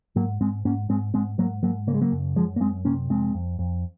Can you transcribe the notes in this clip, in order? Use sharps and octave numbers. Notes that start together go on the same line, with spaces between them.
G#2 F#3 A#3
G#2 G#3 C4
G#2 A#3 C#4
G#2 G#3 C4
G#2 G#3 C4
G#2 F#3 A#3
G#2 F#3 A#3
C#3 A#3
G#3
F#3 A#3
F#2
F#2 F3 G#3
A#3
F#2 G#3 C4
C3 A#3 C#4
F2 G#3 C4
F2
F2